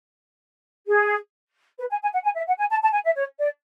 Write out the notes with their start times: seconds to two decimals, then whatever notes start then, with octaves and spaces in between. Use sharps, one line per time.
0.87 G#4
1.79 B4
1.90 G#5
2.02 G#5
2.13 F#5
2.24 G#5
2.36 E5
2.47 F#5
2.59 G#5
2.70 A5
2.82 A5
2.93 G#5
3.05 E5
3.16 C#5
3.39 D5